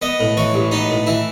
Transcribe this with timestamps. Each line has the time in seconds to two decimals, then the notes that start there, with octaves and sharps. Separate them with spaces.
0.02 B3 D#5
0.20 A2
0.37 E3 C#5
0.54 A1
0.71 B3 D#4
0.90 A2
1.07 E3 E4